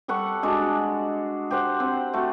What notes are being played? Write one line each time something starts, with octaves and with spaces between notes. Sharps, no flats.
G3 A4 F#5 C#6
G#3 D4 F#4
G4 C5 F#5
C4
A3 F#4